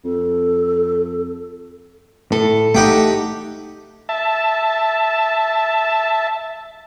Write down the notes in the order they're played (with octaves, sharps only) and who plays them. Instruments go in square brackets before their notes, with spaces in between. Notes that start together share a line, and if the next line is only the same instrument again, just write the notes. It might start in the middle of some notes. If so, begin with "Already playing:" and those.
[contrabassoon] F2 [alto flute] A4
[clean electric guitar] A2 [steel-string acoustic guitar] A4
[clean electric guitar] A3 F#5 [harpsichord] D#4 G4 G5
[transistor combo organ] E5 A5